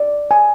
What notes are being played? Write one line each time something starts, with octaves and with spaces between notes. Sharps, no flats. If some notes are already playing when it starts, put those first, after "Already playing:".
Already playing: D5
G#5